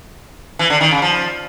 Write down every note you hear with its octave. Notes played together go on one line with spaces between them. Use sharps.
E3
D3
D#3
C#3
F3